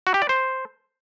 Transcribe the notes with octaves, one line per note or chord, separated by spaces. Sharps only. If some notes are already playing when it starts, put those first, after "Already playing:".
F#4
G4
D5
C5